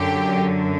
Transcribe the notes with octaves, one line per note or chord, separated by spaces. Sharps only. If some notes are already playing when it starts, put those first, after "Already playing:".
Already playing: F#2 D3 F#3 G4